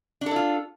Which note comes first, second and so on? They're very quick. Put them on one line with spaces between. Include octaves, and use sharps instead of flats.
D4 A4 E4 F4